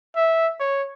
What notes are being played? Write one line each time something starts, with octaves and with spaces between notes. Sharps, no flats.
E5
C#5